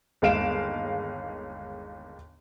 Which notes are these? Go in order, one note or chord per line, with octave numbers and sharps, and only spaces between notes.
G1 D#2 G#3 F5 D7 E7